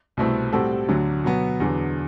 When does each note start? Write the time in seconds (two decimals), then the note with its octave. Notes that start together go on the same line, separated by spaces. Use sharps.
0.17 C2 B2 A3 C4 E4
0.53 A2 G3 C4 F#4 A4
0.89 D2 D3 F#3
1.24 B2 F#3 B3
1.60 E2 D3 F#3